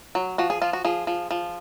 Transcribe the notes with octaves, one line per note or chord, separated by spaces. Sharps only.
F#3
F3 F#4
G#4
F3 F4
F#4
F3 G#4
F3
F3